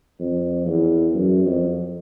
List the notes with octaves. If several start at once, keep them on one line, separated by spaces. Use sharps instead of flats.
F2
E2
F#2
F2